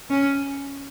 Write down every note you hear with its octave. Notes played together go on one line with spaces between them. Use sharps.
C#4